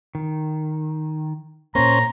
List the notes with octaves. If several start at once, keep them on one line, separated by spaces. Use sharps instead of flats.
D#3
A#2 A#3 C#4 C5 A#5